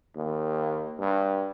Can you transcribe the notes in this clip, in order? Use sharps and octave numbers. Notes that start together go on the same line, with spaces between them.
D#2
G2